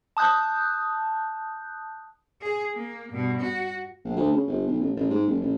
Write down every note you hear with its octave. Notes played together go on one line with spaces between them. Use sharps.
A5 D#6 F#6 G6
G#4
A#3
G2 B2
F#4
A#1
D2
C#3
G1
B1
A1
A1
G#2
F#1
A1